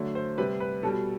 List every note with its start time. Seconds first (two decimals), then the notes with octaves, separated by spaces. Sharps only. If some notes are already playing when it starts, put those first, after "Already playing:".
Already playing: D3 F#3 A3
0.15 C5
0.38 C3 G3 B4
0.60 B4
0.83 B2 G3 A4